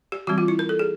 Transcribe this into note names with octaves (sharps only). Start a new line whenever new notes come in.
G4
E3 G3 C4 F#4
F4
E4
A#4
A4
G#4